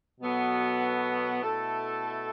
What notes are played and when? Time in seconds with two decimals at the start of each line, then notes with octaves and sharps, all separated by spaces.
0.20 B2 F#3 B3 F#4 A4
1.42 B2 A3 E4 A4